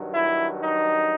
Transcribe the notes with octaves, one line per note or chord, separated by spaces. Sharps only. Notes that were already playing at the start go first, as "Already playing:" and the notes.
Already playing: G2 D#3 F#3
E4
D#4